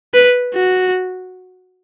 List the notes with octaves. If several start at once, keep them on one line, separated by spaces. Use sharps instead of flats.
B4
F#4